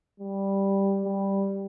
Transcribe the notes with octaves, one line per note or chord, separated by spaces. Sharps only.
G3
G3